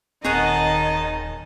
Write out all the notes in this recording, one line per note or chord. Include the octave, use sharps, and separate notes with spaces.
D#1 D#3 C4 G#4 C#5 D#5 F#5 A5